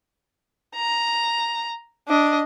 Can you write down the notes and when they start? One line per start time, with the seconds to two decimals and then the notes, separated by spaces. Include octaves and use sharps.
0.75 A#5
2.08 D4 D#5